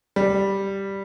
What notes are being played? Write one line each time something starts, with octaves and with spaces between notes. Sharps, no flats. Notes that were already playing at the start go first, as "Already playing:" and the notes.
G3